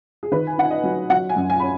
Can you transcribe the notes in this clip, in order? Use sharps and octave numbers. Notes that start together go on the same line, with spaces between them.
G#4
D#3 B4
G#5
D#4 F#5
D#5
F#3
F#3 F#5
G#5
F#2
G#5
C#4 B5